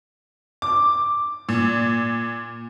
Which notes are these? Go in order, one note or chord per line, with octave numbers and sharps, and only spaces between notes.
D6
A#2